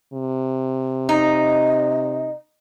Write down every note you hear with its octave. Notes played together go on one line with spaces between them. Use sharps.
C3
D#4 D#5